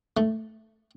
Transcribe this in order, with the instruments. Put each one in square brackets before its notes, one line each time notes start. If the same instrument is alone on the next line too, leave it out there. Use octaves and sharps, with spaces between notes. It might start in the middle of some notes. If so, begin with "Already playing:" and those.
[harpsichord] A3